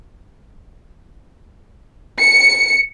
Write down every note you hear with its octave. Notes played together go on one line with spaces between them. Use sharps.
C#7